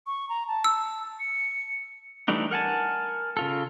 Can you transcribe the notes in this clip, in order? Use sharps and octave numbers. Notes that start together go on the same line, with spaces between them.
C#6
A#5
A5
E6
C#7
E3 G3 A3 D4 D#4
A#4 F#5 G#5 A5
C#3 F4 A4